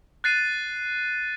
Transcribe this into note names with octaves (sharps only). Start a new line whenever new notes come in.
F#6 A6 C7 D#7